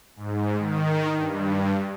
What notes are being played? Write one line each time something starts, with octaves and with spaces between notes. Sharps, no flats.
G#2
D#3
G2